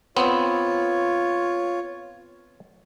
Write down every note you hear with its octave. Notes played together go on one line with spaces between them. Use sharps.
B3 C4 F4 C#5